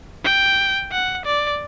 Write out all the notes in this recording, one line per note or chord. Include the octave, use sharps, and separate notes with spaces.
G5
F#5
D5